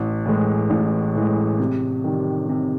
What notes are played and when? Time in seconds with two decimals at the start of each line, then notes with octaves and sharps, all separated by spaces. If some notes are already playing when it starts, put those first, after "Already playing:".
Already playing: A1
0.25 A2 E3 G#3
0.70 A1
1.15 A2 E3 G#3
1.59 C3
2.04 D#3 G3
2.49 C3